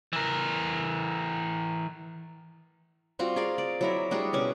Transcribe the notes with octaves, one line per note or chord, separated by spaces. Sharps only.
E3 A#4
G3 C4 F4 F#4
G#4 A#4 D5 F5
D5
F#3 E4 A#4
G3 D4 F#4 G#4
B2 C#4 C#6